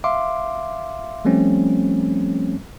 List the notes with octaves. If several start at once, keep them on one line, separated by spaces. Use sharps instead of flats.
E5 F5 C6 D6
F3 G3 A3 C4 C#4